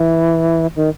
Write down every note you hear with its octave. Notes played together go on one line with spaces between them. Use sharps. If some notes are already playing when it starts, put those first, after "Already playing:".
Already playing: E3
D#3